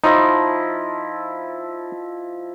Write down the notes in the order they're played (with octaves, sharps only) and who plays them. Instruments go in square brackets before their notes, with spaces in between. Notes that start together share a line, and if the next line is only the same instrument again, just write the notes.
[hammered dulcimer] F3 E4 D#5 [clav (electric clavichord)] D#4